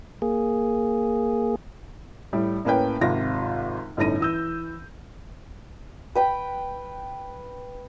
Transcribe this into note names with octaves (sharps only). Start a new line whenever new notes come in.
A#3 G#4
A2 G3
A2 A#3 C#4 B4 G5
G#1 C3 F4 A#6
G1 A2 C#4 D#4 A#6 D#7
E3 E6 G6
B4 G5 B5